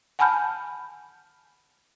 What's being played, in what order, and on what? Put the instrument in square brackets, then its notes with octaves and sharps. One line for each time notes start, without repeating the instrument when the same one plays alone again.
[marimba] F#5 G#5 A5 B5 F6 G6